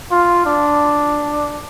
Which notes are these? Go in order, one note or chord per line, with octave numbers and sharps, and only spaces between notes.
F4
D4